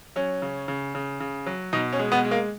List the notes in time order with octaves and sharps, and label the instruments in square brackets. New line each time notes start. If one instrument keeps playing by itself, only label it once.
[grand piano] F#3 C#4
C#3
C#3
C#3
C#3
F#3
B2 D#4
C#4
G#3
B3
G#3
A#3